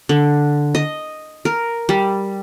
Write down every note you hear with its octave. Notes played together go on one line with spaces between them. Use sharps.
D3
D#5
A#4
G3